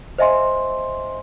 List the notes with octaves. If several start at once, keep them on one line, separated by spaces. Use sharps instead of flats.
C5 D#5 E5 G#5 C6